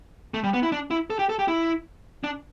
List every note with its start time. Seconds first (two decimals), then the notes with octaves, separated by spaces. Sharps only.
0.34 A3
0.44 G3
0.53 B3
0.63 E4
0.72 D4
0.91 E4
1.10 A4
1.19 G4
1.29 A4
1.39 G4
1.48 E4
2.24 D4